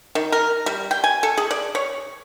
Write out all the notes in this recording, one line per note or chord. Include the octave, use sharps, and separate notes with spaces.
D#3
A#4
G3
G5
G#5
A4
G#4
D5
C#5